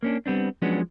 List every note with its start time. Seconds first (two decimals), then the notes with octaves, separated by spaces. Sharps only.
0.03 A#3 C#4 D4
0.26 G3 B3 C4 D4
0.62 F3 F#3 G#3 B3 C#4 D4